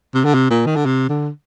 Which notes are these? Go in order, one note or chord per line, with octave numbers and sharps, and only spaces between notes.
C3
D3
C3
A#2
D#3
D3
C3
D3